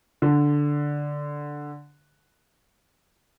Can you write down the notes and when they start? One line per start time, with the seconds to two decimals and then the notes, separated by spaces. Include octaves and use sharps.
0.22 D3